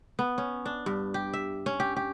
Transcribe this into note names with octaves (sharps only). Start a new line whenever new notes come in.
B3
C#4
D4
G2
G4
E5
C#4
G4
G4